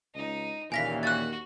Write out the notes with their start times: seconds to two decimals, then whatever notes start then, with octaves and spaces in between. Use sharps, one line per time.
0.15 C#2 D#4
0.72 D#2 A#2 C#3 E3 F5 G#5 A#6 B6
1.03 F#4 F#6 A6